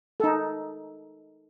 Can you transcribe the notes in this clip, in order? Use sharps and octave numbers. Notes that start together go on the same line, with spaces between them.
D#4 A4